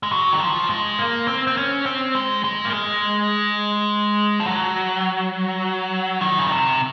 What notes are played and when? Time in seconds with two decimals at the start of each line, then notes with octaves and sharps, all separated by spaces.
0.03 G#3
0.12 F#3
0.32 D#3
0.41 F3
0.70 G#3
0.99 A#3
1.28 C4
1.47 C4
1.57 C#4
1.86 C4
2.15 G#3
2.44 G#3
2.65 A#3
2.73 G#3
4.40 F3
4.46 F#3
6.21 D#3
6.39 C#3
6.49 C3